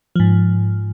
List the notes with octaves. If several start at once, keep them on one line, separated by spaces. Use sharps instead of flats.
G#2 F3